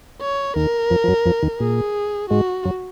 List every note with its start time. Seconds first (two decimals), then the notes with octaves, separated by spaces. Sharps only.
0.22 C#5
0.56 D#2 D#3 A#4
0.90 F2 F3
1.04 F3
1.08 F#2 F#3
1.26 F2 F3
1.43 D#2 D#3
1.60 A#2 G#4
2.30 G#2 G#3 F#4
2.65 F#2 F#3